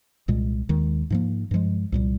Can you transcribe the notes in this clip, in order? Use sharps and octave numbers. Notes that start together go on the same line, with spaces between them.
C2 A#2 G#3
D#2 D#3 G#3
G#2 F3 A#3
G2 F3 G#3
C2 A#2 G3